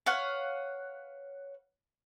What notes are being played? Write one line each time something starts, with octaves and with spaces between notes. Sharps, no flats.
B4 C#5 F5 F#5